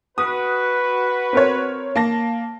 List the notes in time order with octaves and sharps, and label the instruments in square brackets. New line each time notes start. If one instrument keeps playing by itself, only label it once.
[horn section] F#4 B4 [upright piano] D#6
[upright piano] C4 A#4 C#5
A#3 A5 A#6